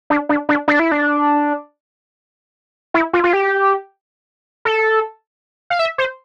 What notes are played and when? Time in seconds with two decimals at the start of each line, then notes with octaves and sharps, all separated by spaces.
0.10 D4
0.29 D4
0.49 D4
0.68 D4
0.79 E4
0.92 D4
2.94 E4
3.13 F4
3.24 F4
3.33 G4
4.65 A4
5.70 F5
5.79 E5
5.98 C5